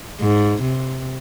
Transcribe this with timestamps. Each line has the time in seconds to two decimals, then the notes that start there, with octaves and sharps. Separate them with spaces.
0.20 G#2
0.62 C3